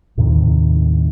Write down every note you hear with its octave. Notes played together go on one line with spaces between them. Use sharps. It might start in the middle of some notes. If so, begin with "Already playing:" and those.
D#2 A2 C3 D#3